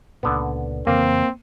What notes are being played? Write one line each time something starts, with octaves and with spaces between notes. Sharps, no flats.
C#2 A#2 D3 B3
F2 C#3 E3 A#3 C4